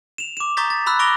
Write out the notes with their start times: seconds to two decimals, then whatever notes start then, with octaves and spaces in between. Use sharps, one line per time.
0.18 E7 F7
0.37 D6 E7
0.57 A#5 C#6 D#6 G6 A6 B6
0.70 A6
0.86 B5 C6 E6 F#6
0.99 C#6 D6 A#6 D7 F7 G7